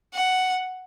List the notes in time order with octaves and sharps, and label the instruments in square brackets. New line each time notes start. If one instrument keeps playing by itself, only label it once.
[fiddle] F#5